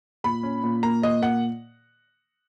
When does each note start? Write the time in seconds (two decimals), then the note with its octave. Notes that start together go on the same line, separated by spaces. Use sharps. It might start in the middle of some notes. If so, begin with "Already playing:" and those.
0.24 A#2 B5
0.43 C#4
0.64 A#2
0.83 A#3 A#5
1.02 A#2 D#5
1.22 A#3 F#5